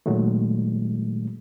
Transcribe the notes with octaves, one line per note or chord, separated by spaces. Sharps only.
A#2 D#3 F#3 G#3 A3